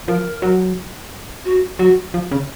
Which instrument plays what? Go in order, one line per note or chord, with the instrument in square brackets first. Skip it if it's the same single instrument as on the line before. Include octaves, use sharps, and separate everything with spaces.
[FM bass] F3 [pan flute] A#4
[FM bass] F#3
[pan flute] F#4
[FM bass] F#3 [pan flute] F#4
[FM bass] F3
C#3